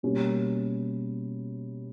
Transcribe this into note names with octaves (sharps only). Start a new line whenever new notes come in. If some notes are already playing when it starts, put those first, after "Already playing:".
B2 G3 A#3 C#4